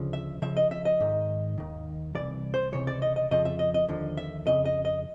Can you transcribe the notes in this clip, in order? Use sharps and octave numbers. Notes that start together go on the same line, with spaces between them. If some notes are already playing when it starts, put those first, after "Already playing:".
Already playing: D2 C#3 F3
E5
C#2 C#3 F3 E5
D#5
E5
D#5
G#2 D#3
D#2 D#3
C2 C3 E3 D5
C5
C#2 C3 E3 C#5
D5
D#5
D#5
F2 C#3 F3 D#5
E5
D#5
D#5
D#2 D3 F3
E5
F2 C#3 D#5
D#5
D#5